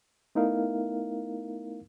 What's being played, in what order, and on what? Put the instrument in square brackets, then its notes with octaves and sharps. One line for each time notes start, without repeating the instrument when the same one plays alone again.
[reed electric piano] A3 B3 D#4 E4 A#4 F5